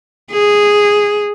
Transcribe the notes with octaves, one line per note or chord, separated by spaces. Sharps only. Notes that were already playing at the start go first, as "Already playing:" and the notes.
G#4